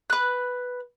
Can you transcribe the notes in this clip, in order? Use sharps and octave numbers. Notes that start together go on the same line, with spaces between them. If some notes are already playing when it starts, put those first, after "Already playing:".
B4 F#6